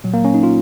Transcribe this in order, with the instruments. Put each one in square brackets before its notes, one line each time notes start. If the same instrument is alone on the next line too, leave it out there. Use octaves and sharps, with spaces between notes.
[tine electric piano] A#2 F#3
A#3
C#4
D#4
F4